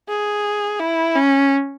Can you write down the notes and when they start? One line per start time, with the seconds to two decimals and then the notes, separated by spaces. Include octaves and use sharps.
0.09 G#4
0.80 E4
1.15 C#4